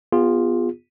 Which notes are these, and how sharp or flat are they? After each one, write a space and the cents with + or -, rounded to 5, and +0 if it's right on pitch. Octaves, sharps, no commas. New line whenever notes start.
B3 +0 F4 +0 G#4 -35